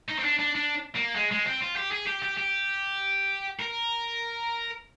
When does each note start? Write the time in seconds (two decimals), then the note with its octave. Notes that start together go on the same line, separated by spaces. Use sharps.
0.09 D#4
0.19 C4
0.24 D4
0.39 D4
0.55 D4
0.95 A#3
1.15 G#3
1.31 G#3
1.46 C4
1.61 F4
1.77 G4
1.92 G#4
2.07 G4
2.23 G4
2.38 G4
3.59 A#4